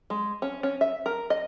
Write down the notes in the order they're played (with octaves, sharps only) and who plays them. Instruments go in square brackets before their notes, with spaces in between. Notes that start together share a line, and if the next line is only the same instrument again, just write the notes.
[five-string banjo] G#3
C#4
C#4
E5
A#4
D#5